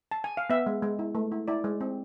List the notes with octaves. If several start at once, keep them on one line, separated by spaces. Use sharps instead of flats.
A5
G#5
F5
B3 E5
G#3
G#3
E4
A3
E4
E4 D5
G#3
C4